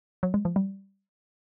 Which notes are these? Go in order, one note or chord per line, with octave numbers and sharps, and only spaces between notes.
F#3
G#3
F3
G3